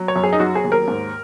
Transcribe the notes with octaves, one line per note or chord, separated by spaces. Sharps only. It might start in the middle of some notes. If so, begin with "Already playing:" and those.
Already playing: F#3
C#5
F#2
G#4
D#4
F#3 F#4
G#4
D#2
A#4
G#2